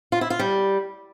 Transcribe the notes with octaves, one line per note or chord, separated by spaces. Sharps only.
F4
E4
F4
G3